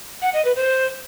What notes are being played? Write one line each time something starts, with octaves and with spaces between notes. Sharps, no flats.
F#5
D#5
B4
C5